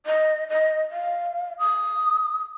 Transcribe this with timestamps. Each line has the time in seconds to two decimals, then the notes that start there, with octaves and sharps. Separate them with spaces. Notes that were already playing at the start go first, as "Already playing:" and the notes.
0.06 D#5
0.49 D#5
0.91 F5
1.59 D#6